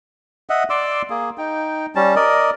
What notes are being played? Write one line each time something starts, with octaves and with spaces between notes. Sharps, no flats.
D#5 E5 F#5
D5 C6 D6 E6
A#3 G#4
D#4 G5
G3 C#4 A5
A#4 D5 D#5